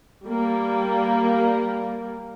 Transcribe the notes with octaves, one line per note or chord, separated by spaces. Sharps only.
G3 A#3